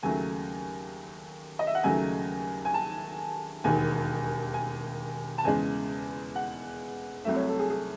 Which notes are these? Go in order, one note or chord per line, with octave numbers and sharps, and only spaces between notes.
D#2 C#3 F#3 A3 G#5
D#5
E5
F#5
D#2 C#3 F#3 A3 G#5
G#5
A5
E1 D#2 D#3 G#5
G#5
A5
E2 C#3 G#3 G#5
F#5
C2 C3 F#3 A3 E5
C#5
A4
G#4
G#4